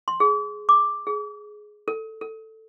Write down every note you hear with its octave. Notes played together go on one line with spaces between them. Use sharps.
C6
G#4
D6
G#4
A4
A4